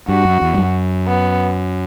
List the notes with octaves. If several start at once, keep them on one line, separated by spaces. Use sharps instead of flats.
G2 F#4
F#2
E2
G2
F#2
B3